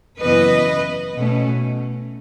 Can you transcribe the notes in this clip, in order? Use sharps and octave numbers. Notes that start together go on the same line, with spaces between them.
F#2 C#3 E3 B3 B4 D#5
B2 A3 C#4